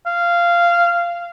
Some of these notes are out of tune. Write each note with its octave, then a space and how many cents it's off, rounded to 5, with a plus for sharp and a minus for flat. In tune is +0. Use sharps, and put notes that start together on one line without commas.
F5 -15